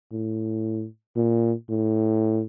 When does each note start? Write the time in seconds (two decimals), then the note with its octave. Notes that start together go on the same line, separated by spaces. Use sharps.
0.12 A2
1.16 A#2
1.69 A2